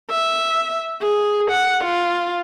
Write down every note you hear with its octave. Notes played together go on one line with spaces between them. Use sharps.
E5
G#4
F#5
F4